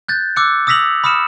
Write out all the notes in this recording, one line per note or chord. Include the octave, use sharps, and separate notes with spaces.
F#6 G6 A6
D6 E6 F#6 C#7
D#6 E6 A#6 B6 F7 F#7
B5 D#6 F6 C#7 E7